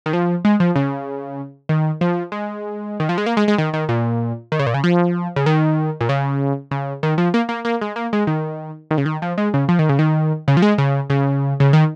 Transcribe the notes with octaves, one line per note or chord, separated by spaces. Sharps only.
D#3
F3
G#3
F3
C#3
D#3
F3
G#3
D#3
F3
G#3
A#3
G#3
G#3
D#3
D#3
A#2
D#3
C#3
A#2
C#3
F3
C#3
D#3
A#2
C#3
C#3
D#3
F3
A#3
A#3
A#3
G#3
A#3
G#3
D#3
D#3
C#3
D#3
F3
G#3
C#3
F3
D#3
C#3
D#3
C#3
F3
G#3
C#3
C#3
C#3
D#3